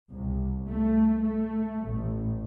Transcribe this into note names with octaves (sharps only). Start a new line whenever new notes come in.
C2
A3
A3
A1